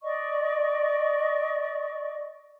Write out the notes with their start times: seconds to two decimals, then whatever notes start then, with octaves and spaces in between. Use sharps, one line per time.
0.03 D5 D#5 C#6